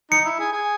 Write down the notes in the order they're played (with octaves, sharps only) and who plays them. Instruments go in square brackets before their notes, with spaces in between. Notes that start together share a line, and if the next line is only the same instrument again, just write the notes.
[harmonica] D#4 [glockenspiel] C#7
[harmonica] E4
G#4
G#4